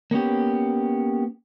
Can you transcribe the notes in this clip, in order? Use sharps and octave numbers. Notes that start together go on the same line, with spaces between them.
A#3 B3 C#4 G4